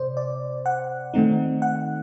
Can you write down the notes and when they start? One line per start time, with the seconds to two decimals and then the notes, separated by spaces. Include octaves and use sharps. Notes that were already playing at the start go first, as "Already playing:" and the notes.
Already playing: C3 C5 D5
0.17 D5
0.66 F#5
1.14 D#3 A3 C4 D#4
1.62 F#5